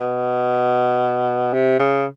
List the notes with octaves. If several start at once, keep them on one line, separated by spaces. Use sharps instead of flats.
B2
C3
C#3